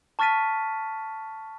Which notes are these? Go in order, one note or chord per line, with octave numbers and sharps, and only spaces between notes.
A5 C#6 F6 A6 B6 D#7